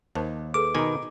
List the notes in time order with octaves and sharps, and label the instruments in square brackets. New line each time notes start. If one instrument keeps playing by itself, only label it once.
[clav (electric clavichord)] D#2 [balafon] A#4 C5 A5
[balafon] G#4 A4 B4 [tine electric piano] D6
[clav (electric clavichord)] B2 D#3 G#5 [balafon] D#5 A#5